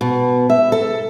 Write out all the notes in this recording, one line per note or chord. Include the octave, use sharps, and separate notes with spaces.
B2
E5
A4